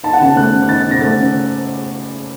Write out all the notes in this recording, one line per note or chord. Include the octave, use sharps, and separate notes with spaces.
D#4 A5
F#5
C#3 A5
A3 F#6
C#3
F#6
D#4 A6
C#3
A#6
A3 A6
C#3